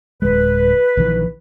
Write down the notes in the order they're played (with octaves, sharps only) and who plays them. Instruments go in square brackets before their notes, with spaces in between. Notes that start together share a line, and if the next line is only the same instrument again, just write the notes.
[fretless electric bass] D1 G#3 [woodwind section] B4
[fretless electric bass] A#1 D#3 E3